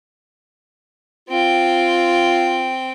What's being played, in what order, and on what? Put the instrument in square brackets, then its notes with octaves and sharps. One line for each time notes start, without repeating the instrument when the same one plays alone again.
[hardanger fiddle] C4 G5 [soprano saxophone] F4